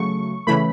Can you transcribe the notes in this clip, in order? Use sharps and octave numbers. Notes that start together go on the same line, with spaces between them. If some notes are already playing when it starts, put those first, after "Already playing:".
Already playing: C#3 F#3 A3 C#6
C#3 E3 A3 B5